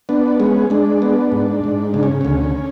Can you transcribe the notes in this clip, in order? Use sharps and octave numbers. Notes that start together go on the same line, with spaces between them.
B3 D4
G#3 C#4
G#3 D4
B3
G#2
G#2
C#3 D4
C#4
D2 C#4